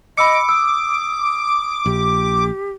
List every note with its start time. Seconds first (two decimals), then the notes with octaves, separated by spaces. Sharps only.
0.17 D#5 B5 D6 E6 C#7
0.49 D#6 E6
1.86 A#1 G4